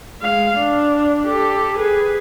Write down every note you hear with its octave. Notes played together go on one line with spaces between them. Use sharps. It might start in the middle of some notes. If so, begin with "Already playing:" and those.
G#3 F5
D4
G4 A4
G#4 B4